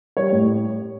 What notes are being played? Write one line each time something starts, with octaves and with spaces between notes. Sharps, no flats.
G3 C#5
A2